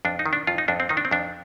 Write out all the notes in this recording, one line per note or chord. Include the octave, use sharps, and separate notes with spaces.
F2 D4
D#4
D#3
D4
F2 F4
D#4
F2 D4
C4
D#3 D#4
D4
C4
F2 D4